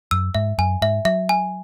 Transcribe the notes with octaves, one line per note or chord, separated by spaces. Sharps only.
F#2 E6
G#2 E5
F#2 G#5
G#2 E5
F#3 E5
G#5